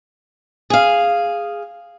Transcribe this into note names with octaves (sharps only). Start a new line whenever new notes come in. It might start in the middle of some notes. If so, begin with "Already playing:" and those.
G#4 F5